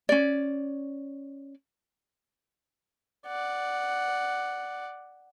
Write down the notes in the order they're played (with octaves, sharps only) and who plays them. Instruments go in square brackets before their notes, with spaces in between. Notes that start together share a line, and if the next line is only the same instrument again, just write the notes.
[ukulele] C#4 D5
[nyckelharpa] D5 F#5